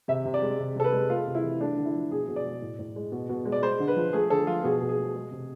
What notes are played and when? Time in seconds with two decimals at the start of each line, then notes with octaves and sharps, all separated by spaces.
0.08 C3 E5
0.25 C3
0.34 D5
0.42 G#3
0.59 C3
0.76 C3 A4
0.84 B4
0.93 G#3
1.10 A3 F4
1.27 C3
1.35 E4
1.44 E3
1.61 A3 D4
1.77 D3
1.85 E4
1.94 F3
2.11 B2 G#4
2.28 B2
2.36 D5
2.45 G#3
2.62 A2
2.79 A2
2.96 G#3
3.12 B2
3.29 B2
3.45 G#3
3.52 D5
3.62 G#3 C5
3.80 D3
3.88 B4
3.96 F3
4.13 A3 G#4
4.30 D3 A4
4.47 F3 F4
4.64 B2 G#4
4.81 B2
4.89 G#4
4.98 A3
5.15 G#3
5.31 C3